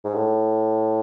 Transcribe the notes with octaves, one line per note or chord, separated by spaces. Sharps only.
G#2
A2